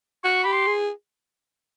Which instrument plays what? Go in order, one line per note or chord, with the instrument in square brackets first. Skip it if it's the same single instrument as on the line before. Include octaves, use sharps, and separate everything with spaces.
[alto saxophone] F#4 [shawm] C#6
[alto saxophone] G4 [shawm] B5
[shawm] C6
[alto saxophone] G#4